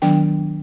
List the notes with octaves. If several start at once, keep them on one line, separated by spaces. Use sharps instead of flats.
D#3 F#3 B3 D4 G5